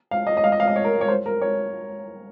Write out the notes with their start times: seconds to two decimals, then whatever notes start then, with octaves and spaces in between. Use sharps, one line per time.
0.11 F5
0.27 D#5
0.37 D#5
0.44 F5
0.52 D#5
0.60 F5
0.67 D#5
0.76 C#5
0.84 A#4
1.01 C#5
1.08 C5
1.26 A#4
1.41 C#5